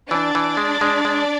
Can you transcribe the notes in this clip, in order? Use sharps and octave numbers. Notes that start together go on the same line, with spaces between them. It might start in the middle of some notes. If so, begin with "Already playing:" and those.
E3 D4 D5
E3
G#3
G#3
G#3